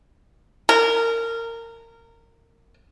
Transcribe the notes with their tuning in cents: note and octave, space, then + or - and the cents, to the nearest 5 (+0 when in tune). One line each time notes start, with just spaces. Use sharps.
A#4 -20